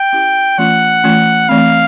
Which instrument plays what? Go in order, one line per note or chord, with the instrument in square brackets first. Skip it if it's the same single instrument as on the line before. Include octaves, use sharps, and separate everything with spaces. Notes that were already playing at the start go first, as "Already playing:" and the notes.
Already playing: [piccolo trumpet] G5
[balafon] C#4 E4 G4
[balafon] E3 A3 C#4 F4 [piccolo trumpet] F#5
[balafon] E3 A3 C#4 F4
[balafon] E3 A3 C4 [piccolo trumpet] F5